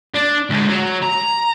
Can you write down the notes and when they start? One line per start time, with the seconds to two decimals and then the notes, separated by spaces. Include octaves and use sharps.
0.15 D4
0.50 D2 G#3
0.69 F#3
1.03 A#5